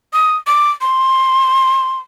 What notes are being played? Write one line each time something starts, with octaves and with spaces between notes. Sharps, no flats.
D#6
D6
C6